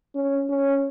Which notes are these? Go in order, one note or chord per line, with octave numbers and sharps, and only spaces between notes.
C#4
C#4